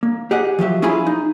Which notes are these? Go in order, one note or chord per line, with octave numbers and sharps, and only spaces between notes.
A#3
G4 G#4 D#5 F#5
F3 F#3 G4 E5
C#4 E4 F4 G#4 B5
D#4